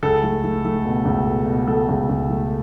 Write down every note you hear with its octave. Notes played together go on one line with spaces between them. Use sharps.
C#2 A4
A3
A3
A3
B2
C#2
B2
B2
A3 A4
C#2
C#2
A3